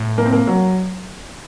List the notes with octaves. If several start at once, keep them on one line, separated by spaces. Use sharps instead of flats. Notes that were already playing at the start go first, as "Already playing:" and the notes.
Already playing: A2
A#3
C4
A#3
F#3